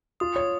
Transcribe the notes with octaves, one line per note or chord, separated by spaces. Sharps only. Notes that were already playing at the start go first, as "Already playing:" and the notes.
F4 D#6
C#5 D#6